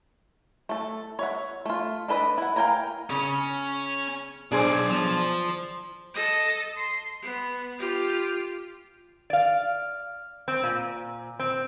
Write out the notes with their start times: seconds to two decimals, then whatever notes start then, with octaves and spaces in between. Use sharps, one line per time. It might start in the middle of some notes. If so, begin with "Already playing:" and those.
0.69 A3 A4
1.19 C#5 E5 F#5
1.66 A3 F4
2.08 D4 A4 B4 C#5 D#5
2.38 E4 F#5
2.56 A#4 F5 G5 G#5 A#5
3.10 C#3 C#4
4.52 B1 D4 G#4 C5
4.90 F3
6.14 A4 D#5
6.77 C6
7.23 B3
7.79 F4 G4
9.30 D5 F5
10.48 C4
10.64 A#2
11.39 C4